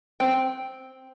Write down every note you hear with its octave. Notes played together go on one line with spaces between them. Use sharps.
C4 G5